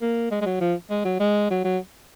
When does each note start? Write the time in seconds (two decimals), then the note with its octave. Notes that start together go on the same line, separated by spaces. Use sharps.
0.02 A#3
0.31 G#3
0.42 G#3
0.46 F#3
0.61 F3
0.91 G#3
1.05 F#3
1.20 G#3
1.50 F#3
1.64 F#3